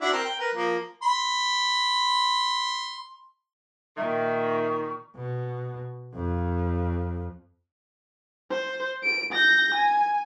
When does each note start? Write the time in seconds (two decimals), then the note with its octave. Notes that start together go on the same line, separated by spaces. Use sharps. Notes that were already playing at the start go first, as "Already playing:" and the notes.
0.01 D4 E4 F#4
0.13 C4 A#4
0.25 G5
0.40 A#4 B4
0.55 F3 A#3
1.03 B5 C6
3.97 A#2 D#3 E5 C#6
5.16 B2
6.14 F2
8.50 C5
9.03 D7
9.32 G6 A#6
9.74 G#5